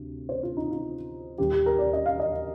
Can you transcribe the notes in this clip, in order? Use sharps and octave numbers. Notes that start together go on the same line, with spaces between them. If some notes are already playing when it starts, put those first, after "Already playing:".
Already playing: D2 C3
C5
F4
D#4
F4
D#2 D#3 G3 G4
G4
A#4
D5
D#5
F5
D#5